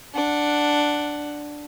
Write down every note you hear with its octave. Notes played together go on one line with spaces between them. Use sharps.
D4 F#5